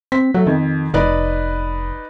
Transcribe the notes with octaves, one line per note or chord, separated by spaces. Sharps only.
C4 B6
F#3 A3
F2 D#3
F1 D#4 B4 D5